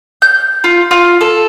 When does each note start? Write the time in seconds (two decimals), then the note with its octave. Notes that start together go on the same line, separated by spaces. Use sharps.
0.22 G6
0.64 F4
0.91 F4
1.21 A4